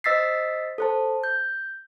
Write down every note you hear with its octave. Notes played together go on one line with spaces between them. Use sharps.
C5 D#5 E6 A6 B6 C7
A4 C5 A5
G6